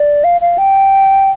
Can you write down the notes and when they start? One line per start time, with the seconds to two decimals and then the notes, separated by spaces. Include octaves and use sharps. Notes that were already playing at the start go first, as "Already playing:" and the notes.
Already playing: D5
0.24 F5
0.41 F5
0.58 G5